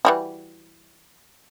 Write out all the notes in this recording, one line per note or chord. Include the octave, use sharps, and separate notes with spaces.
E3 G3 F#4